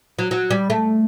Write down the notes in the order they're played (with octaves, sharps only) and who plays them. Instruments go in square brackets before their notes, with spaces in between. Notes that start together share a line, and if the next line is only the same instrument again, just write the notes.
[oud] F#3
F#3
G3
A3